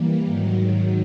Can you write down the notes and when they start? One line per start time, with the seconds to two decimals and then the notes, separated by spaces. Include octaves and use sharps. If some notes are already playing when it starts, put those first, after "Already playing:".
Already playing: E3 G3 A#3
0.25 G#2 D#3 F#3